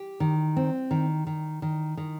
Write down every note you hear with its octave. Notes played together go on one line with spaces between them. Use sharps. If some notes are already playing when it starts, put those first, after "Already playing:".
Already playing: G4
D#3
C4
D#3
D#3
D#3
D#3